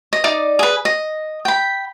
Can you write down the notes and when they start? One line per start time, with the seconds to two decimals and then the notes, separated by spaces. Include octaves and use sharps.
0.13 D#5
0.24 D#4 D5 D6 D#6
0.59 G#4 B4
0.85 D#5
1.45 G5 B5